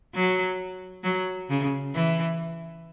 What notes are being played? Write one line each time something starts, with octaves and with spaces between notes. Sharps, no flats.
F#3
F#3
C#3
E3